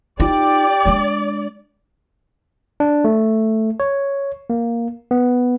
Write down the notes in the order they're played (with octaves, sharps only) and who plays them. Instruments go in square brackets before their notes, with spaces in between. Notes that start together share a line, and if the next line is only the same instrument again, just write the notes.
[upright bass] D#4 F4 [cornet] G4 [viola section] D5
[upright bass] G#3 D4
[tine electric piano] D4
A3
C#5
A#3
B3